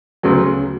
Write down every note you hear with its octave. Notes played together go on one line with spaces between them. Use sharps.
D2 C#3 F#3 B3